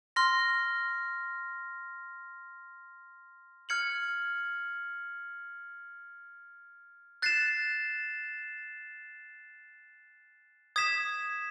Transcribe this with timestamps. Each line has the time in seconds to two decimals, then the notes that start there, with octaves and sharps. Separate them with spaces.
0.16 C6 F6 A#6
3.69 F6 G#6 C#7 F#7
7.22 F#6 A6 C7 E7
10.76 D#6 G#6 B6 E7